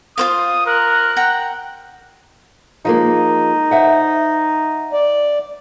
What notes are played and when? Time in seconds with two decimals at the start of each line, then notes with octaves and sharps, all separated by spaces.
0.18 F4 C5 F5 D#6
0.67 A#4 F#6
1.16 F#5 G5 A#5
2.85 F3 G#3 A#3 D#4
3.71 C5 E5 F#5
4.93 D5